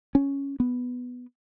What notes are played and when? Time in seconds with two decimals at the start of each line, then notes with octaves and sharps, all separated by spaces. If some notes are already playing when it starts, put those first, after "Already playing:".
0.15 C#4
0.60 B3